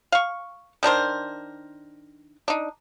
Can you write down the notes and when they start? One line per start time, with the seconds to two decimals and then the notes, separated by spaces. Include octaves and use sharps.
0.12 F5 C#6
0.83 D#3 D4 A#4 C5
2.48 D4 D#4